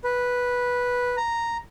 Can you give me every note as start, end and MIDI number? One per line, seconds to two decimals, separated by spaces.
0.04 1.16 71
1.17 1.57 82